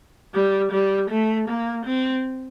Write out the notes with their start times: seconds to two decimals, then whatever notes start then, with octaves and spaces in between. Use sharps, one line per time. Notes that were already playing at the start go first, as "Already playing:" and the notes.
0.34 G3
0.72 G3
1.10 A3
1.48 A#3
1.85 C4